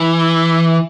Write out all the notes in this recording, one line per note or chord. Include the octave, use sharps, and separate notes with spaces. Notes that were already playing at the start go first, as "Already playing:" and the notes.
Already playing: E3